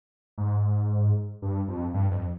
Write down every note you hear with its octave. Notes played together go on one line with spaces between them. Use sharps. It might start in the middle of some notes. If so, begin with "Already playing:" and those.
G#2
G2
F2
G2
F2